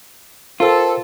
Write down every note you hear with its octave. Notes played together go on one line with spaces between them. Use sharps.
F4 A4 A#4 C5 G5